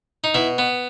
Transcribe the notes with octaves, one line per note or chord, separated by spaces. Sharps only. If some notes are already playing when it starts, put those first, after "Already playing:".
D#4
B2 E4
B3